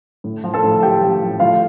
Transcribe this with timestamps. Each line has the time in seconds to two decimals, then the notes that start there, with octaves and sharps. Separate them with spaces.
0.24 A2
0.44 F3
0.54 A4 A5
0.64 A2
0.82 F3 G4 G5
1.02 A2
1.22 F3
1.40 A2 F4 F5